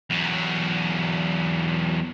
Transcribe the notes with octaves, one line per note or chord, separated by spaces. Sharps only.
E2 F#3